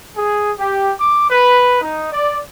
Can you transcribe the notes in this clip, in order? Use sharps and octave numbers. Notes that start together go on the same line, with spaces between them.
G#4
G4
D6
B4
D#4
D5